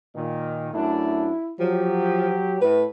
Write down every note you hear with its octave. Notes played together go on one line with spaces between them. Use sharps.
A#2 D#3
F#2 A3 D4 E4
F3 F#3 G4
A2 B4